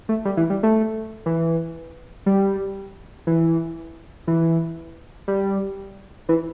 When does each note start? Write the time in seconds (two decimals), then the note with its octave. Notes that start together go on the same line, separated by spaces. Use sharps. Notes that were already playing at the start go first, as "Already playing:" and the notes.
0.09 A3
0.25 G3
0.37 E3
0.50 G3
0.63 A3
1.26 E3
2.26 G3
3.27 E3
4.27 E3
5.28 G3
6.29 E3